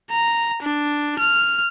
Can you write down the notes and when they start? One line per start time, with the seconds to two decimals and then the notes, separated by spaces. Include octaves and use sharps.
0.11 A#5
0.62 D4
1.19 F6